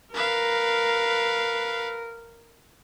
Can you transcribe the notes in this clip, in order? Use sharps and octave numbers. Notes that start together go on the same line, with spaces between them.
A#4 B4 F5